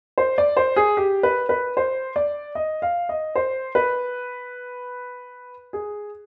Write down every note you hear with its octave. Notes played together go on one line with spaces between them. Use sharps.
C5
D5
C5
G#4
G4
B4
B4
C5
D5
D#5
F5
D#5
C5
B4
G#4